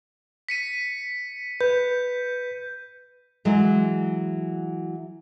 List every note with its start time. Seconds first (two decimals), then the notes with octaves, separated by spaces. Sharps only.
0.49 B6 C#7 D#7
1.61 B4 G6
3.45 E3 F#3 G#3